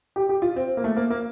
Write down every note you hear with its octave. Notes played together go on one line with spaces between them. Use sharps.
G4
G4
F4
C4
A#3
A3
A#3
A#3